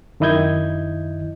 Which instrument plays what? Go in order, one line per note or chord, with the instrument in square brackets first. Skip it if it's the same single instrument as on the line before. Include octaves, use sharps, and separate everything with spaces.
[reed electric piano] F#2 D#3 E4 D#5 G6 G#6